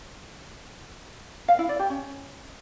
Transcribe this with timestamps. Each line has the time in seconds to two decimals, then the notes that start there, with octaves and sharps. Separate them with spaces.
1.48 F5
1.59 E4
1.69 D5
1.79 G4
1.90 C#4